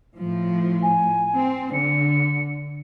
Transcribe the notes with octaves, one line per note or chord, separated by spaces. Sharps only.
A2 F3
G#5
C4
D3 C#7